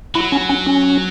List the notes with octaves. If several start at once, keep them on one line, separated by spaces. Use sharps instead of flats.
F#3 E4
C#4
C#4
C#4